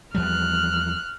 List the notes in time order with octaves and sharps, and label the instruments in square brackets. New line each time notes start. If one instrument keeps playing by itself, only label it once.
[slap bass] E2 F3 G3 [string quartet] F6 F#6